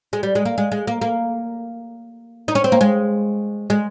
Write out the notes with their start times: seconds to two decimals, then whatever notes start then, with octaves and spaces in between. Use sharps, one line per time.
0.13 G#3
0.23 G3
0.35 G#3
0.45 A#3
0.58 G#3
0.72 G#3
0.87 A#3
1.01 A#3
2.48 D#4
2.55 C#4
2.64 C4
2.72 A#3
2.81 G#3
3.70 G#3